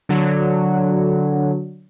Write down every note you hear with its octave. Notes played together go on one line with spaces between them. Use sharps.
D3 F#3